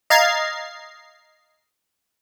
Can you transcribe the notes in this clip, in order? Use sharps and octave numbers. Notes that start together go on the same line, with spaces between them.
D#5 F5 A#5 G#6 A6 C7